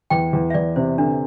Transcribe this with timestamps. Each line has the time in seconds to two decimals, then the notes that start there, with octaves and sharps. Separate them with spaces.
0.10 E2 G5
0.33 E2
0.50 E5
0.54 E2 D5
0.76 C3 C5
0.98 D3 D4